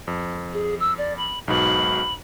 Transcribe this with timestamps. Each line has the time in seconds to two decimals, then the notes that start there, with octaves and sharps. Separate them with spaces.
0.08 F2
0.53 G#4
0.80 E6
0.98 D5
1.17 B5
1.48 B1 G#2 B2 B5